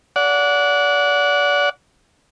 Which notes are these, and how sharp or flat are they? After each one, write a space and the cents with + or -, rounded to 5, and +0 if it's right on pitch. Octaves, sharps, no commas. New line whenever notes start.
D5 -30 F#5 -15